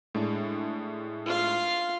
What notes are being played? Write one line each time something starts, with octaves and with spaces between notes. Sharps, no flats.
A2 G#3 D4
F4 F5